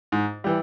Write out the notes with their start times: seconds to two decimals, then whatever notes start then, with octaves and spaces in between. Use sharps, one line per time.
0.12 G#2
0.44 E3 G3